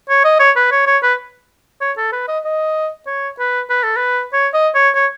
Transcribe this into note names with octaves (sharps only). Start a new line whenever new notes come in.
C#5
D#5
C#5
B4
C#5
C#5
B4
C#5
A4
B4
D#5
D#5
C#5
B4
B4
A4
B4
C#5
D#5
C#5
C#5